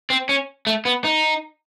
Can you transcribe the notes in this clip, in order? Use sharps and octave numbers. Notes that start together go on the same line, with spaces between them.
C4
C#4
A3
B3
D#4